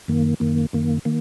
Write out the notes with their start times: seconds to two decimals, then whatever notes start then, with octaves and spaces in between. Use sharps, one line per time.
0.08 F#2 D#3 A#3
0.40 F#2 D#3 A#3
0.73 F#2 D#3 A#3
1.05 D#3 A#3